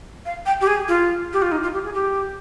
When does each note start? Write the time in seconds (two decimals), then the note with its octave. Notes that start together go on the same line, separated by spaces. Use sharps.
0.26 F5
0.46 G5
0.61 G4
0.67 G#4
0.88 F4
1.33 G4
1.42 F4
1.52 D#4
1.63 F4
1.74 G4
1.85 G#4
1.94 G4